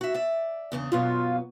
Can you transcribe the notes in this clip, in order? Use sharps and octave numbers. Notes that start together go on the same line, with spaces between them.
F#4 E5
D5 E5
E2 C#3 D4
F#2 B2 B3 F4